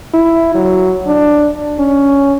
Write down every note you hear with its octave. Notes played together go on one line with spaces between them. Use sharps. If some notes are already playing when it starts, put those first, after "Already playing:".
E4
F#3
D4
C#4